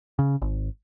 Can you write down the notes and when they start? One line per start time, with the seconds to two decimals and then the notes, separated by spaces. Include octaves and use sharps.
0.19 C#3
0.42 G#1